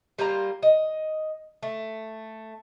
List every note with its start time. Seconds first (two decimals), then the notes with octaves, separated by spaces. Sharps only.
0.19 G3 A#3 F4 A#5
0.63 D#5
1.63 A3